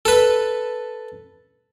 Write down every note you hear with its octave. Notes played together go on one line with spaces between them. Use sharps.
A4 B4